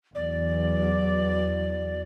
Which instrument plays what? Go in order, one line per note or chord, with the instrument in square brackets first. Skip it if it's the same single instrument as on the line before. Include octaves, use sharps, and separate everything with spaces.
[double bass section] E2 F#3 [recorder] D5